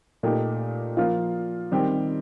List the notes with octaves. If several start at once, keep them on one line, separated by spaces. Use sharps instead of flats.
A#2 A3 D#4 G4
F3 A#3 F4
D#3 G3 C4 G4